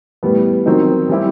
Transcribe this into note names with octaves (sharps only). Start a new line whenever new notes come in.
A2 G3 B3
D#3 F#3 C4 D#4
G3 C4 E4 G4